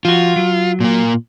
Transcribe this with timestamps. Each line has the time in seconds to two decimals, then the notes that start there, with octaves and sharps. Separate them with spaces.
0.05 F3 F4 F#4
0.36 F#3
0.80 A#2 A#3